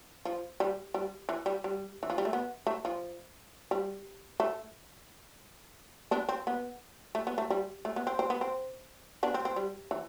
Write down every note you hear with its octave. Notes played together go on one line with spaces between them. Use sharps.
F3
G3
G3
E3
G3
G3
E3
F3
G3
A3
B3
A3
F3
G3
A3
B3 D4
C4
B3
A3
B3
A3
G3
A3
B3
C4
C4
B3
C4
B3 D4
C4
C4
G3
E3